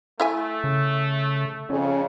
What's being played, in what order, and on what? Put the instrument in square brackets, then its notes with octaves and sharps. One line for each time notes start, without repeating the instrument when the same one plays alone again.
[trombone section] A3 [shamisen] E4 E5 G#5
[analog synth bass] C#3
[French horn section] F2 C#3 [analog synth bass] C#4